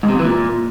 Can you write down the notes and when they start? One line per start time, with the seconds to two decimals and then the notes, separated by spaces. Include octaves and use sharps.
0.03 G#2
0.09 C3
0.14 F2
0.19 E3
0.25 A#2